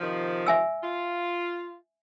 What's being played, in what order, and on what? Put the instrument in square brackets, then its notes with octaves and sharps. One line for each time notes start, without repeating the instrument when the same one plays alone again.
[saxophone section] C3 D#3 F3
[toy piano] E5 G#5 E6
[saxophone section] F4